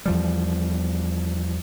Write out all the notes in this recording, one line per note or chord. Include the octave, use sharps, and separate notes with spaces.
E2 F3 G3